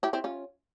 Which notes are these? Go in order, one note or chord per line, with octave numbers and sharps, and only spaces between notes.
E4 G4
C4 E4
C#4 F4